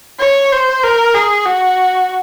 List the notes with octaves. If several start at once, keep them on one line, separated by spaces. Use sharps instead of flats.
C#5
C5
A#4
G#4
F#4